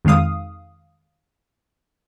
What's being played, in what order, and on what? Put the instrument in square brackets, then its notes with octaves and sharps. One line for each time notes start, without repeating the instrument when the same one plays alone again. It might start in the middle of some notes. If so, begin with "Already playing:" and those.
[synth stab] F2 D#3 G#3 F5 D#6